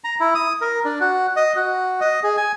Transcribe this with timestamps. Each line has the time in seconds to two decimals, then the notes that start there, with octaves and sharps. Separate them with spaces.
0.04 A#5
0.20 E4
0.35 D#6
0.61 A#4
0.85 D4
1.00 F#4
1.36 D#5
1.56 F#4
2.01 D#5
2.23 G#4
2.37 G#5